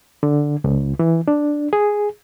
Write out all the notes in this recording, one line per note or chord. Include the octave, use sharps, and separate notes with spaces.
D3
C#2
E3
D4
G#4